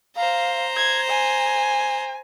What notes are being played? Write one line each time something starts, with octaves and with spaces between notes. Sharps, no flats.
C5 F5 A#5
G#6
G#5